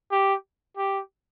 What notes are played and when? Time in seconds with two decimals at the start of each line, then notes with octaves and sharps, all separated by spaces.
0.11 G4
0.77 G4